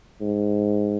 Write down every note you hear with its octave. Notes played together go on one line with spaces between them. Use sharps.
G#2